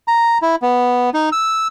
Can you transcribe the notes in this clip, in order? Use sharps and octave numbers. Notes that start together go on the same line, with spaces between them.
A#5
E4
B3
D#4
E6